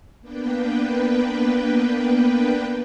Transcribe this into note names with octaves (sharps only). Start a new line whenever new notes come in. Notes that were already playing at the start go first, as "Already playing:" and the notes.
A#3 B3 D4 B4 G5